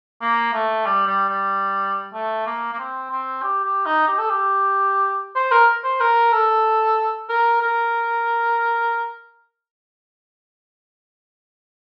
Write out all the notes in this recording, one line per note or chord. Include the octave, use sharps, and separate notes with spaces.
A#3
A3
G3
G3
G3
A3
A#3
A#3
C4
C4
G4
G4
D#4
G4
A4
G4
C5
A#4
C5
A#4
A4
A#4
A#4